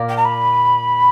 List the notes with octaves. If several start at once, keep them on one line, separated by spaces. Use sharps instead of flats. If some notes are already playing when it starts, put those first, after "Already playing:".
Already playing: A#2 A#3 A#4 D5
G5
A#5
B5